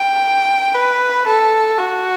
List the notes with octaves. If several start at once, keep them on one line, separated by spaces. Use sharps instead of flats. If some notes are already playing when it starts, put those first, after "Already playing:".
Already playing: G5
B4
A4
F#4